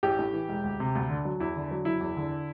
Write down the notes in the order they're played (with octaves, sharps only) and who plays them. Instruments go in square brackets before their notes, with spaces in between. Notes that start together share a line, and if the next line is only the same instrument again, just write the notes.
[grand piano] A1 G4
A2
E3
E1
D2
C3
D2
D3
F#3
E2 E4
D3
F#3
F#1 E4
E2
D3